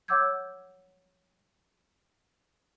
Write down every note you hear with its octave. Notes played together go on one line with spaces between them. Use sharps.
C#5 F#5 D6 E6 G6 G#6